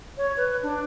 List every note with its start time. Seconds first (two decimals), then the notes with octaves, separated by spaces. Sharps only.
0.17 C#5
0.37 B4
0.63 D4